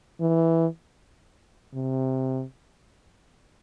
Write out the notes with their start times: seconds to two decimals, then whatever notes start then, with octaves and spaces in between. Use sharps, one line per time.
0.20 E3
1.74 C3